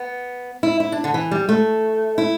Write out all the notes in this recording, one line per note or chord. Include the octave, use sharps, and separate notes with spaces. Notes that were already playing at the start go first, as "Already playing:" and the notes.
Already playing: B3
E4
E4
D4
D3
E3
G3
A3
E4